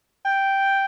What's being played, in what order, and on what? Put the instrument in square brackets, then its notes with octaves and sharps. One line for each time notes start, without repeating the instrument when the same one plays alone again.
[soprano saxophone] G5